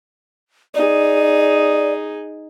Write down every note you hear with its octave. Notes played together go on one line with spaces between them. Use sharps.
D#4 G#4 D5